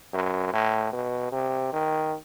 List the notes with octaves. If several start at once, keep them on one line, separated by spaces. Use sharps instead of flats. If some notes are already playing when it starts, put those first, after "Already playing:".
F#2
A2
B2
C3
D#3